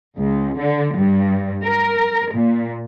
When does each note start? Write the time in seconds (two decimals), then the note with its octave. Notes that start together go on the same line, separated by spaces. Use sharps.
0.17 C#2
0.58 D3
0.95 G2
1.63 A#4
2.33 A#2